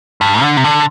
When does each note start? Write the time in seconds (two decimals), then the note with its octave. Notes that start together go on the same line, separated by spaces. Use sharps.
0.21 G2
0.42 D3
0.57 C3
0.64 D3